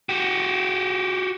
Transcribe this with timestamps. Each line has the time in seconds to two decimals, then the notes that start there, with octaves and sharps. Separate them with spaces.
0.09 F#4 G4